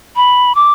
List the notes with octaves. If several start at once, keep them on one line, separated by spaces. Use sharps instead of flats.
B5
D6